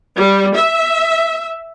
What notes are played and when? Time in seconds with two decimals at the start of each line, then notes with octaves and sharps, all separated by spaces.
0.16 G3
0.56 E5